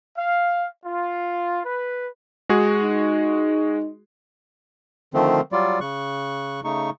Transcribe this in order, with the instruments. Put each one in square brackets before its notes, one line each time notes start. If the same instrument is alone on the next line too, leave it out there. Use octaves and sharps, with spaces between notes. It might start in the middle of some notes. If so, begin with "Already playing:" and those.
[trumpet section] F5
F4
B4
[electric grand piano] G#3 F#4 G#4
[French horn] D#4
[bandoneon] D3 D#3 F3 A3 C4
F#3 G3 F4 D5
C#3 C#6 F#6
C#3 A3 D#4 C#6